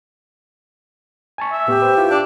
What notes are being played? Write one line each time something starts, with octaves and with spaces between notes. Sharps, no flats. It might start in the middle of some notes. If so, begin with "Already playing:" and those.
G#5 A5 C#6
E5
A2 B3 G4
B4 C5
E4 F4
D4